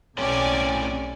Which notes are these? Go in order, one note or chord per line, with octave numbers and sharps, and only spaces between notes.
B1 A2 C4 C#4 G4 D5 G#5